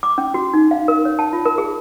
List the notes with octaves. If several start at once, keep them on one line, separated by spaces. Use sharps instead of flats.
D6
C#4
F#4
D#4
F5
A#4
C#5
A5
F4
A#4
G#4